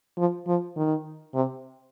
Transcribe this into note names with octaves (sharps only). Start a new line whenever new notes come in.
F3
F3
D#3
C3